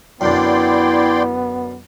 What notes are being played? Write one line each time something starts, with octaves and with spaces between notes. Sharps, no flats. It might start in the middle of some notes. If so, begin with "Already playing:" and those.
F#2 D3 B3 E4 D5 G5 C6